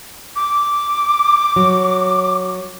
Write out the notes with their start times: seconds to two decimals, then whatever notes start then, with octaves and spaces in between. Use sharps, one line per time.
0.36 D6
1.56 F#3